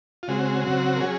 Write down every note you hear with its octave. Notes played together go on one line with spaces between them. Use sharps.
F4
C#3 G#3 C4 F#4
C#3 F#3 C4
A#4
F#3 C#4 G#4